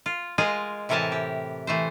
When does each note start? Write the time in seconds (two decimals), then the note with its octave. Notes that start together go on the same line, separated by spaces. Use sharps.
0.06 F4
0.38 G#3 F4 G#4 A#4 D#5 G#5
0.89 A2 C3 E3 A#4 G#5 A5
1.12 G4
1.67 E3 A3 C5